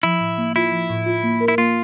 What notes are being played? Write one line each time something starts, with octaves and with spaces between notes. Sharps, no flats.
F3 E4
A2
A#3
E4 F4
F3
A2
F4
A#3
A#4
E4
A#3 F4